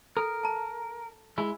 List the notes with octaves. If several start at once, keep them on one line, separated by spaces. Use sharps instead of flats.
A4 A#4
A5 A#5
G#3 E4